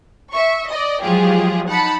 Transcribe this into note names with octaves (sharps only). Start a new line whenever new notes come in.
E5 C#6
D5 D#5
F3 F#3 G#3 F4 G4 G#4
D#4 F#5 A5 B5 C#7